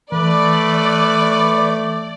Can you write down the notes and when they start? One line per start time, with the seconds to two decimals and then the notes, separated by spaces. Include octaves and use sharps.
0.12 E3 A3 B4 D5